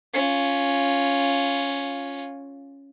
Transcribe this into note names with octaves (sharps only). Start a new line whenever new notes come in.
C#4 F4